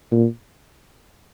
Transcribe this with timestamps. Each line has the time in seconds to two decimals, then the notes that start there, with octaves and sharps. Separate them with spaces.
0.12 A#2